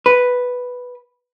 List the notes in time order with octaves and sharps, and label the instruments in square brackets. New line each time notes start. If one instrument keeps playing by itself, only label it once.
[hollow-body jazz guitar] B4